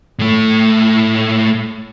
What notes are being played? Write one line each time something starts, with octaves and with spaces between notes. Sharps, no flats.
A2 A3